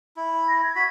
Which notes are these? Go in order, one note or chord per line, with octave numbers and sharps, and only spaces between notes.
E4
A#6
G#6
F#4 B5 B6